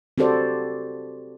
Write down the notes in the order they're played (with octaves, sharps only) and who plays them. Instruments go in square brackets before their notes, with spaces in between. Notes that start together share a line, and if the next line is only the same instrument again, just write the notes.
[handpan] C4 F#4 G4 A4 C5 D5